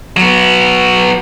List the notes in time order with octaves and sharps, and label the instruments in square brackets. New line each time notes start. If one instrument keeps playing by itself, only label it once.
[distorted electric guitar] F#3 B3